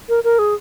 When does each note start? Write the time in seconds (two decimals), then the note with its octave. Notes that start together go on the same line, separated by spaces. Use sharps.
0.09 A#4
0.24 A#4
0.39 G#4